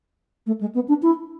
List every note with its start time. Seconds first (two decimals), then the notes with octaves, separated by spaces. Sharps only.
0.46 A3
0.61 G#3
0.74 B3
0.88 D4
1.02 E4